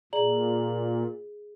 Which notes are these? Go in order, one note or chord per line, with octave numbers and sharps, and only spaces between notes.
A#2 G#4 D5 A#5 F#7